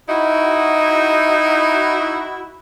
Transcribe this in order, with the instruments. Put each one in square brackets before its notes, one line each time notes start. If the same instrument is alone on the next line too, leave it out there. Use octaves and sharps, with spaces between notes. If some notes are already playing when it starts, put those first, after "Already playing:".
[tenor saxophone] D#4 [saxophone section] E4 F#4